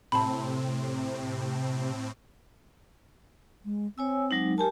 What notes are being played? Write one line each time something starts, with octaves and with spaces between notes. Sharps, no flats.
A2 C3 C4 A5 B5
G#3
C4 C#5 G#5 E6
F#3 G#3 D#4
G4 A#4 G#5 A5